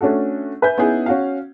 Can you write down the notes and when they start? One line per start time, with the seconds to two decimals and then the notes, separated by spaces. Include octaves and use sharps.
0.01 A3 C#4 D4 F#4 A4
0.62 B4 E5 G#5 G6
0.78 B3 C#4 D#4 E4 G#4
1.06 C#4 F#4 F5